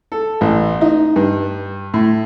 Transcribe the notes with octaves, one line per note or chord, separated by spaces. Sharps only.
A4
A1
D#4
G2
A2